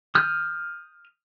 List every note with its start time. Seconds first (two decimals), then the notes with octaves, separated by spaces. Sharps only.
0.15 D#6 F6 G6